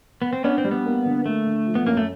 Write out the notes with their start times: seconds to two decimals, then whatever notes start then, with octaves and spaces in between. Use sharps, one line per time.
0.22 B3
0.33 C4
0.44 B3 C#4 D4
0.58 C4
0.65 G3
0.71 B3
0.86 A#3
1.05 D3
1.25 A3 A#3
1.46 D3
1.67 F3
1.75 B3
1.87 F#2 A#3
1.97 A3